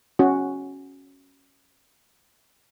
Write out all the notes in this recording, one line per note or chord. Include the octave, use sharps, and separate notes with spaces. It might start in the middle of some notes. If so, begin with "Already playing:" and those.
C#4 F#4